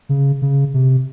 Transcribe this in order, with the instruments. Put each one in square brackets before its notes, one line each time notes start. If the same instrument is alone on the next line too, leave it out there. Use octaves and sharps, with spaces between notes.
[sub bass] C#3
C#3
C3